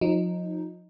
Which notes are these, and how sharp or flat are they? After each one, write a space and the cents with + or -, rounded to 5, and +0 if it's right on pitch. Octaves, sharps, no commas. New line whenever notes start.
F3 +40 D#4 +0